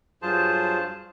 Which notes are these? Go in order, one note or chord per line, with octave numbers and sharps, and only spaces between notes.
G2 F#3 F4 G#4 C5 A5